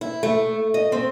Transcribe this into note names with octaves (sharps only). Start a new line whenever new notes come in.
E4
A3
D#5
C4